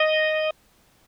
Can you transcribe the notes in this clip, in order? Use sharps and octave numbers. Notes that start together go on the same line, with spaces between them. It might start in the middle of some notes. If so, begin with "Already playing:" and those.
Already playing: D#5